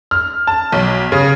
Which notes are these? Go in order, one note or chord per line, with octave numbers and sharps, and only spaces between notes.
F6
A5
B1
C#3